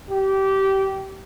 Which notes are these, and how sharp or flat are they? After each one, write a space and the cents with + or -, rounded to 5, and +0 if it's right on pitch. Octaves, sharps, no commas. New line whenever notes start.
G4 -20